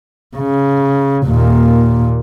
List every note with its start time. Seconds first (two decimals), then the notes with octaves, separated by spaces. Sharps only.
0.36 C#3
1.26 D#2 A#2